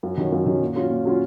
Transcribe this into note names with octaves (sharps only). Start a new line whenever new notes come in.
F#2
D#3 F#3 C#4
F#2
D#3 F#3 C#4
A#2
F#3 C#4 F4
A#2
F#3 C#4 F4